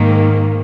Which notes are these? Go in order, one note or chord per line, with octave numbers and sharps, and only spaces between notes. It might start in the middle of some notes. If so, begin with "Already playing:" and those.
Already playing: G#2 D#3 A#3